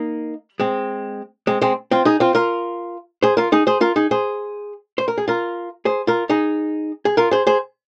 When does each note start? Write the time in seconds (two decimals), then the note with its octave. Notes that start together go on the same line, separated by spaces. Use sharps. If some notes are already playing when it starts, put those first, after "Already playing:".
Already playing: A#3 D#4
0.60 G#3 C4
1.47 G#3 C4
1.62 G#3 C4
1.91 C4 F4
2.05 D#4 G#4
2.20 C4 F4
2.35 F4 A#4
3.23 G#4 C5
3.37 F4 A#4
3.52 D#4 G#4
3.67 G#4 C5
3.81 F4 A#4
3.96 D#4 G#4
4.11 G#4 C5
4.98 C5
5.08 A#4
5.18 G#4
5.28 F4 A#4
5.85 G#4 C5
6.07 F4 A#4
6.30 D#4 G#4
7.05 G#4
7.17 F4 A#4
7.31 G#4 C5
7.47 G#4 C5